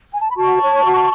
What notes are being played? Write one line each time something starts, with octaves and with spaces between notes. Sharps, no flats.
G#5
A5
B5
F#4 A5 C#6
C#5
F#4